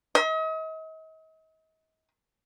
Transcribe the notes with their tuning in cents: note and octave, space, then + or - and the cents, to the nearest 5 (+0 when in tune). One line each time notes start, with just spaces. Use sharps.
D#5 +40